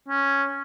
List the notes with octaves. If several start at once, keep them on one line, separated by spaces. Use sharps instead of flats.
C#4